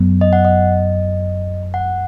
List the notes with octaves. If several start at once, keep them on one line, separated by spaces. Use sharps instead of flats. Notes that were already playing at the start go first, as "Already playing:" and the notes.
Already playing: F#2 F#3 B3
D#5
F#5
D#5
F#5